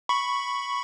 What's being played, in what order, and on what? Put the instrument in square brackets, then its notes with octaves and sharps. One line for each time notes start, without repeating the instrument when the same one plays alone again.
[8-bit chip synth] B5 C#6